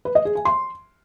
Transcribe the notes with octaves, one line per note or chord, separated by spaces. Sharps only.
B4
D#5
G#4
G#5
C6